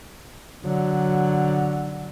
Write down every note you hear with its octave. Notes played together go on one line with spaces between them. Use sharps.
D3 F#3